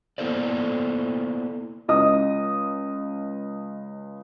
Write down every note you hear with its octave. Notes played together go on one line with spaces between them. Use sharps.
A#3 B3 E4 A4 C5 D5
C#2 D#5 D#6